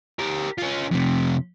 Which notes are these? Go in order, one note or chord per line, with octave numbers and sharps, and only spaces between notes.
G4 A#4
C#4 F4
F2 C3